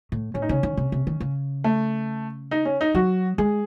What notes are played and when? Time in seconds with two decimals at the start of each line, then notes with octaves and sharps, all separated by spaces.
0.12 A2
0.34 A2 C#4
0.42 D#4
0.49 C#3 C#4
0.63 D#3
0.77 C3
0.92 C3
1.07 D#3
1.20 C#3
1.64 A3
2.51 D#4
2.65 C#4
2.81 D#4
2.95 F#3 F#4
3.38 G#3 G#4